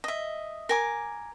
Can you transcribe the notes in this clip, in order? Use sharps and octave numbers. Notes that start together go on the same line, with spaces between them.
D#5 E5
A#4 G#5 D6